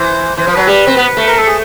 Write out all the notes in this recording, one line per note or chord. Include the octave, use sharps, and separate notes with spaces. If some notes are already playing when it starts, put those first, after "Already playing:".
Already playing: E3 C5
E3 C5
F3
F#3 B4
G3
C4
B3
A3
A#4
A4
G#4